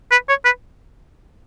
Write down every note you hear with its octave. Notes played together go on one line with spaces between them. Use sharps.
B4
C#5
B4